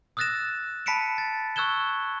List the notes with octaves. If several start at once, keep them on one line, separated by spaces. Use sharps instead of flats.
D#6 E6 F#6 A6 A#6 E7
A5 B5 B6 C#7 D7 E7
A6
C#6 E6 F#6 G#6 E7 G7